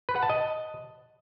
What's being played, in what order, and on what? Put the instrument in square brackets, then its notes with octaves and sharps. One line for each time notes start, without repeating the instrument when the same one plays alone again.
[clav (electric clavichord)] B4
F#5
A5
D#5